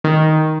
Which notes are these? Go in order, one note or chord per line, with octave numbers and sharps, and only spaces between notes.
D#3